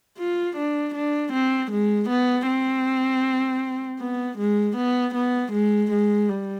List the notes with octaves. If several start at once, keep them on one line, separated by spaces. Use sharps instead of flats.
F4
D4
D4
C4
G#3
B3
C4
B3
G#3
B3
B3
G#3
G#3
G3